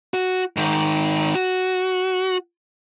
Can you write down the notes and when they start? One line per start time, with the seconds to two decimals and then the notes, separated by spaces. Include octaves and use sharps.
0.14 F#4
0.57 G#2 D#3
1.35 F#4